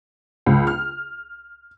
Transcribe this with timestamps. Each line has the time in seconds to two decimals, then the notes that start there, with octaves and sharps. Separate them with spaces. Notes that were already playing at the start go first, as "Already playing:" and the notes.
0.46 C#2
0.67 F6